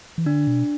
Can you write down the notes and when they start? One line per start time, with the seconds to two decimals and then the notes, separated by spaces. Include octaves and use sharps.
0.18 E3
0.26 D3 D4
0.47 B2